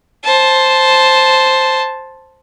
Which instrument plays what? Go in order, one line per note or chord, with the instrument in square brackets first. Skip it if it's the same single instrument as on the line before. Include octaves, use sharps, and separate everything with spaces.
[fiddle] C5 A5